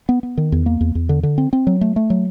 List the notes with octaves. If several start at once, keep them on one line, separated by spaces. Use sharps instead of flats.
B3
B3
D#3
E2
A#3
E2
E2
D3
D3
C4
C4
F#3
A3
A3
F#3